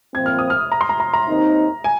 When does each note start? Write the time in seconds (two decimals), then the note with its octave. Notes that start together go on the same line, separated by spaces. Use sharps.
0.14 A#2 F3 C4 G#6
0.26 F6
0.39 D#6
0.50 F6
0.72 A#5
0.81 C6
0.89 A#5
1.00 A#5
1.14 A#5
1.28 D#2 D#3 C4 D#4
1.84 G#5